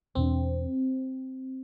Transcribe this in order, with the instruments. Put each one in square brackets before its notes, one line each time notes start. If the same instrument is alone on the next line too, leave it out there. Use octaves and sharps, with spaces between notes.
[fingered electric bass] E2 B2 B3 D4 [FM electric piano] C4